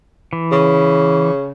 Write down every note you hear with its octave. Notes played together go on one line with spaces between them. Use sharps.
E3
C#3